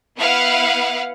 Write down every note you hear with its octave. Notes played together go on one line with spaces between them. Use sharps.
B3 E4 B4 F5 F#5